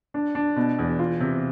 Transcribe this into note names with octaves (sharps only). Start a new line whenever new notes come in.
D4
D4
B2
E2
F4
C3